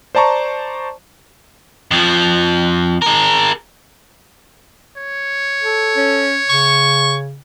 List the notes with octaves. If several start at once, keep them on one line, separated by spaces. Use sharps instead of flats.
C5 D5 A5 A#5 C#6
F2 F3
G#4 A#4
C#5
A4
C#4
C#3 C#6